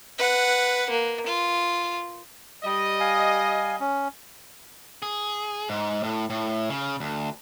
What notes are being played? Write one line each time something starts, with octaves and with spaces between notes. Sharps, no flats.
B4 F#5
A#3
F4
G3 D#5
F5 G#5
C#4
G#4
G#2
A2
A2
C#3
D2